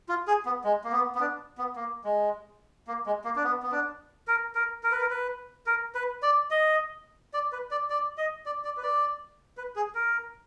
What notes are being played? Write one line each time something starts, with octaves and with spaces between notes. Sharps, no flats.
F4
G#4
B3
G#3
A#3
B3
B3
D4
B3
A#3
G#3
A#3
G#3
A#3
D4
B3
B3
D4
A#4
A#4
A#4
B4
A#4
B4
A#4
B4
D5
D#5
D5
B4
D5
D5
D#5
D5
D5
B4
D5
B4
G#4
A#4